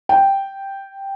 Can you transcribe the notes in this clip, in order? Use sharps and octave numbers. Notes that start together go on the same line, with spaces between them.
G5